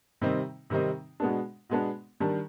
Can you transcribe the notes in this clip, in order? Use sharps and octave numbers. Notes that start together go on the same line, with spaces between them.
C3 D#3 G3 C4 D#4
C3 D#3 G3 C4 D#4
B2 G#3 B3 D4
B2 G#3 B3 D4
D#3 G3 D4